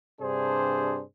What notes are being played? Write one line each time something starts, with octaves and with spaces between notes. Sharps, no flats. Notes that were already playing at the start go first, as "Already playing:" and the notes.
G2 C3 D4 G#4 C5